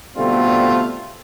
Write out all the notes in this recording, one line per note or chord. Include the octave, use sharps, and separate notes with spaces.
B2 D3 G3 A3 C4 F4